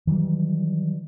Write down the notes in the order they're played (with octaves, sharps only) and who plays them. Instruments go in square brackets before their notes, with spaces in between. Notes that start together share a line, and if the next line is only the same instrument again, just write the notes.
[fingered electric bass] D#3 E3 F#3 G3